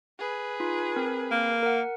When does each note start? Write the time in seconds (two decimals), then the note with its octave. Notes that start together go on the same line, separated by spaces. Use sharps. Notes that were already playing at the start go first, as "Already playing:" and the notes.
0.19 G#4 B4
0.60 D#4 F4
0.96 C4 A#4
1.31 A#3
1.63 A#4 F#5